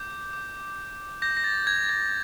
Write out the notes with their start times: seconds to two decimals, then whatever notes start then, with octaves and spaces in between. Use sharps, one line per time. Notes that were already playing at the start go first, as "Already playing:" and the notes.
Already playing: D6 G6
0.33 D6 G6
1.22 D6 G6 A#6
1.37 A#6
1.44 A6
1.67 G#6
1.89 G#6